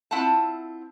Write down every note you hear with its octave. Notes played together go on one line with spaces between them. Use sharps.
C4 E4 F4 F#5 A5